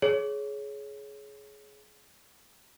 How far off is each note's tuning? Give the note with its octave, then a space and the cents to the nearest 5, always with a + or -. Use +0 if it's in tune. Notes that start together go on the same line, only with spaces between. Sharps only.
G#4 +20 C#5 +5